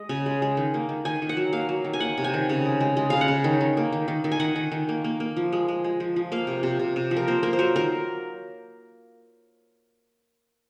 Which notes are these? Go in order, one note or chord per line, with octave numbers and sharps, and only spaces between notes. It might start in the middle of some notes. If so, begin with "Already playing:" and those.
Already playing: G#3 D#5
C#3 G#5
G#3
G#3
D#3
A#3
D#3
D#3 G#5
D#3
F#5
F#3
A#3 F5
F#3
D#3
G#5
A#3 F#5
C3
G#5
D#3
C#3
G#3
G#3
G#3
C#3 F5
F#5
C#3
D#3
D#3
A#3
D#3
D#3
D#3
G#5
D#3 F#5
D#3
D#3
A#3
A#3
A#3
F3
G#3
G#3
G#3
F3
F3
A#3 F5
C3
C3
C3
C3
F3
A#4
A#3 C5
A#3 A#4
C5
F#3 A#4
D#3 A#4